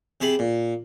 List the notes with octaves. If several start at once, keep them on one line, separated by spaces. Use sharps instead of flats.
C3 G#4 A5 B5
A#2